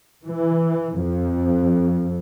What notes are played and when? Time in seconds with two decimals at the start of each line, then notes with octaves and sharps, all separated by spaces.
0.24 E3
0.98 F2